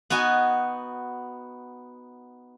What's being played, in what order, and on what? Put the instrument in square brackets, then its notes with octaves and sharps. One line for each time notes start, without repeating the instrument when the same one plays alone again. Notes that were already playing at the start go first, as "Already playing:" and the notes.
[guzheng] B3 D#4 F#4 G#5